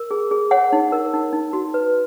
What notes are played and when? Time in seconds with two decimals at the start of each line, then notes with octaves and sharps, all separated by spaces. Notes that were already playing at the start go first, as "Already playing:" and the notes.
Already playing: A#4
0.11 G#4
0.31 G#4
0.51 C#5 F#5
0.73 D#4
0.92 A#4
1.13 D#4
1.33 D#4
1.53 F#4
1.74 B4